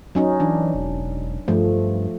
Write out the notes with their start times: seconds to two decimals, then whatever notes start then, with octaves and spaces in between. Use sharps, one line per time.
0.15 F#3 C#4 D#4
0.40 E3 D4
0.75 E1
1.48 G2 F3 A3